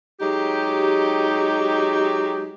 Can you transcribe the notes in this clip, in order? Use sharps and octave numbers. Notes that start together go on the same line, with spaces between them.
F#3 G#3 D#4 G4